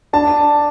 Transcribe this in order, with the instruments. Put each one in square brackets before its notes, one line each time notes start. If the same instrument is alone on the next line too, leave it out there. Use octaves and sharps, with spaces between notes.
[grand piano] D4 A5